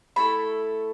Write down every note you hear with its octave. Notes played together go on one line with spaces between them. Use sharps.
A3 E4 A4 B5